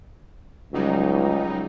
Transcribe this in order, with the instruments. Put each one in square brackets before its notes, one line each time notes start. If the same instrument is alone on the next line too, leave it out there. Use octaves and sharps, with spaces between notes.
[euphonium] C#2 [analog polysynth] F#3 G3 D#4